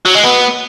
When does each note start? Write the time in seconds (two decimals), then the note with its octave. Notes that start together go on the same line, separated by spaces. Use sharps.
0.06 F#3
0.15 G#3
0.24 B3